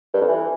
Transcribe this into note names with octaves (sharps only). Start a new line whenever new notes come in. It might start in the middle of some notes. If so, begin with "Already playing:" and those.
G2
F2
E3